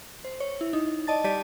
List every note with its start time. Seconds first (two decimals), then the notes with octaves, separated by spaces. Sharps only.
0.24 C5
0.40 C#5
0.61 E4
0.73 D#4
1.07 D5 D#5 A5 A6
1.24 G3 G4 D5 A5 B6 D#7